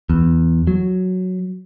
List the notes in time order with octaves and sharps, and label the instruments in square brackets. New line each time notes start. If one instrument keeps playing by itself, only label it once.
[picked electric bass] E2
F#3